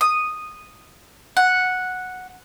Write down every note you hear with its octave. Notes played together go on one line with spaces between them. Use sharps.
D#6
F#5